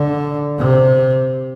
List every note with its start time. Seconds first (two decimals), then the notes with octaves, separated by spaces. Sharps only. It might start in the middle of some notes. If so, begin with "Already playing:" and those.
Already playing: D3
0.58 C3